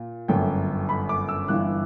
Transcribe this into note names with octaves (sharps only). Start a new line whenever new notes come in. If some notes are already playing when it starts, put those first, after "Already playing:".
Already playing: A#2
G1 F#2 D3 G5
B5
D6
E6
G1 G2 E3 F#6